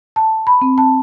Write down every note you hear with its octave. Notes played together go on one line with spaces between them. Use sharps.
A5
B5
C4
A5